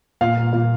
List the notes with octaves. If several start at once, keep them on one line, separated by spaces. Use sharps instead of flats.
A#2 F5
A#3
A#2